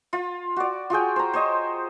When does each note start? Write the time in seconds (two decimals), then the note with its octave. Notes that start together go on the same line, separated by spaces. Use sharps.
0.13 F4
0.56 F#4 D5
0.90 F4 F#4 G#4 G5
1.16 C5 A#5
1.33 C5 C#5 D#5